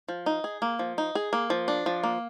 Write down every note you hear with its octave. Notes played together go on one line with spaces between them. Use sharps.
F3
D#4
G#4
A#3
F3
D#4
G#4
A#3
F3
D4
F3
A#3